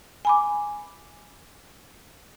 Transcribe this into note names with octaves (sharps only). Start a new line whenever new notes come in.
G#5 B5 D6